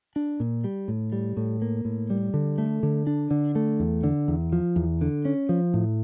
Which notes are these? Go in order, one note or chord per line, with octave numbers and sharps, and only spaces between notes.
D4
A#2
G3
A2
G3
A2
A#3
A2
G3
D3
A3
D3
D4
D3
A3
E2
D3
E2
F3
E2
D3
C#4
F3
A2